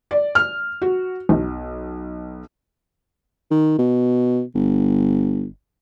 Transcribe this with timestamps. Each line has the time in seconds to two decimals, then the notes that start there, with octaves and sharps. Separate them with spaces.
0.11 D5
0.35 F6
0.82 F#4
1.29 B1
3.51 D#3
3.78 B2
4.55 G1